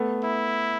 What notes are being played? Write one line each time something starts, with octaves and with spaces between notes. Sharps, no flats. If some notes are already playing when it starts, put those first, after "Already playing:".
Already playing: A3 B3
E4